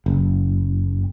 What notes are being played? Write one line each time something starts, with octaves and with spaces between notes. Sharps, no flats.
F#1